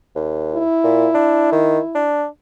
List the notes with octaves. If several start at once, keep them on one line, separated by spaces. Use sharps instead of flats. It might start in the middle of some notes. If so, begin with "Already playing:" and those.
D#2
E4
A#2
D4
D#3
D4